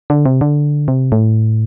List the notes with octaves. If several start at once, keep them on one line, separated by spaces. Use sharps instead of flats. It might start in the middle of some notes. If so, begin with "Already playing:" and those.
D3
C3
D3
C3
A2